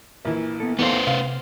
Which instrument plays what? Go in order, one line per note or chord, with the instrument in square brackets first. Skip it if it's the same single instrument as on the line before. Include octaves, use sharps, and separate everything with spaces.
[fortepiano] A#1 E3
[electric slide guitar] B3 A4
[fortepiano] E2 [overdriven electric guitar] B3 C5 [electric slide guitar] D#4 A4 F5
[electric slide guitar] C3 [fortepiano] F5